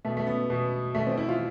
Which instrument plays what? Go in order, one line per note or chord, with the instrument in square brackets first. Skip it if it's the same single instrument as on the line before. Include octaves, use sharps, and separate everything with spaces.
[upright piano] B2 A3
A3
B3
B2
B2 A3
C4
E4
F4